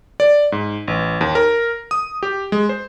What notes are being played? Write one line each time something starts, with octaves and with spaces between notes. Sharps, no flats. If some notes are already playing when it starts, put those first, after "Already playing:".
D5
G#2
A1
D#2
A#4
D#6
G4
G#3
C5